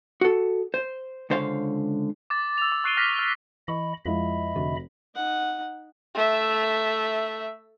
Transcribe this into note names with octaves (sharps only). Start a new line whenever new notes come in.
F#4 A4
C5
C#2 D3 C5 C#5 F5
D6 A6
E6 F7
D6
C#6 F#6 C7 D7 D#7 G7
F6 F#6 A#6 B6
F6
E3 D#5 B5 C#6
F2 F3 G#3 E4 D#5 E5 B5
F1 D3 F#4
D#4 F#5
A3 E5